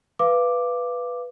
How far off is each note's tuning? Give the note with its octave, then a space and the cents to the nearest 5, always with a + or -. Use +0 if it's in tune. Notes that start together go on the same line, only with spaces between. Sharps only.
B4 +0 F5 -25 D6 +0